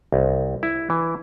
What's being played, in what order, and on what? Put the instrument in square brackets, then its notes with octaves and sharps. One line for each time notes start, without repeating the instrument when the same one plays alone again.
[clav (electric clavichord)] C2
E4
E3